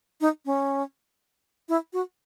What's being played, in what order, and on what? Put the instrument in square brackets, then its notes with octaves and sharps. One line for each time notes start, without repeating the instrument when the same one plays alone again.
[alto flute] D#4
C#4
E4
F#4